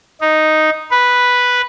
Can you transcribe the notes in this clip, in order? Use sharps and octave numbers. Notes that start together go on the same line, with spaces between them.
D#4
B4